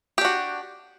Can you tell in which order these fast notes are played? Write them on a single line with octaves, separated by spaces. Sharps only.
G4 D4 F#4